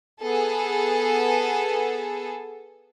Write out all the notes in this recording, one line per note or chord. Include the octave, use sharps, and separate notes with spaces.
B3 G#4 A4